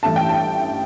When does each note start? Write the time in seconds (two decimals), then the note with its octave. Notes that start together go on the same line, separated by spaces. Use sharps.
0.03 A1 G2 E3 A3 E4 A5
0.16 G5
0.29 A5